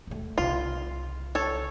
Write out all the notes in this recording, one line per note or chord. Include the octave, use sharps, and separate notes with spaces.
D#1 A3
C2 C#3 F4
A4 C#5